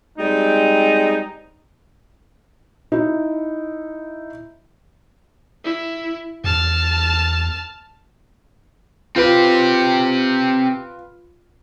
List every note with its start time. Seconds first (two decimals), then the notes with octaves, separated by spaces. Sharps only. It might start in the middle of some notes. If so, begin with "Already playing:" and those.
0.18 G3 G#3 C4 D#4
2.92 D#4 E4
5.64 E4
6.44 E2 A5 F6
9.16 C4 F4 G4 B4